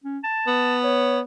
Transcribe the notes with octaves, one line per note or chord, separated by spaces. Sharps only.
C#4
A5
B3
C#5